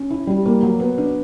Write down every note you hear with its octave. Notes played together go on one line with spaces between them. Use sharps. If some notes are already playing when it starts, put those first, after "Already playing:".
Already playing: C#4
E4
G3
A#3
F#3
B3
D4